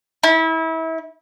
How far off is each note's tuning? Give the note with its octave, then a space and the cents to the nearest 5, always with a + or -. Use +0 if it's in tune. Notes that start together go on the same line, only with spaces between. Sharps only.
E4 -30